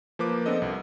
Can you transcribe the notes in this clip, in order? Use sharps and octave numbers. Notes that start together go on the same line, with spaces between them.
F3 A#3 B4 D6
B3 C4 D4 A4 D#5
C2